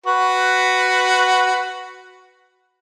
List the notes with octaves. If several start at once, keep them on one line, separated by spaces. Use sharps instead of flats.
F#4 B4